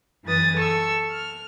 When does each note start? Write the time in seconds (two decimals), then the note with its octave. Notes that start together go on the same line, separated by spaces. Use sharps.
0.24 F#2 E3 B4 D#6 A6
0.56 A4 C#6 E6
1.11 F6